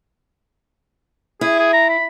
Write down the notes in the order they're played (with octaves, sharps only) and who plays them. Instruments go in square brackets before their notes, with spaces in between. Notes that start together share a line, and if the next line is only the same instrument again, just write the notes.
[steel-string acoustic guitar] E4 [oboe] G#4
[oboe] G#4
A#5
B5